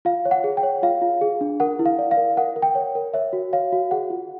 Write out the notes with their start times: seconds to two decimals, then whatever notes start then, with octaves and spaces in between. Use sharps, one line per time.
0.05 F4 F5
0.25 C#5
0.31 F#5
0.44 G#4
0.57 G5
0.63 C#5
0.83 F4 F5
1.02 F4
1.21 G#4
1.41 D4
1.60 A#4 F#5
1.79 E4
1.86 F5
1.99 D5
2.11 F5
2.17 A#4
2.37 A#4 F#5
2.56 A#4
2.62 G5
2.75 C#5
2.95 A#4
3.14 C#5 E5
3.33 F#4
3.53 C#5 F5
3.72 F#4
3.91 G#4 F#5
4.10 F4